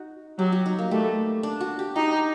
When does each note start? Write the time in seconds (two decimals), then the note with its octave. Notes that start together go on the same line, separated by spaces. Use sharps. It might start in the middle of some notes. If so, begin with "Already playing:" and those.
Already playing: D#4 F#4
0.39 F#3 G4
0.52 F#4
0.66 D#4
0.79 A#3
0.91 G3 A3
1.43 D4
1.61 F#4
1.79 G4
1.96 D#4 G4